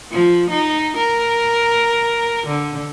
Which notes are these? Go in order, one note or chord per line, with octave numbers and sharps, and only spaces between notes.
F3
D#4
A#4
D3